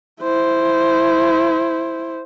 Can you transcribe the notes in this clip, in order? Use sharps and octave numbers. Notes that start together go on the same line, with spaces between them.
E4 C5